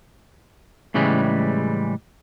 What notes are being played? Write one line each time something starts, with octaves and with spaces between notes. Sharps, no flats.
A2 C#3 E3 G3 G#3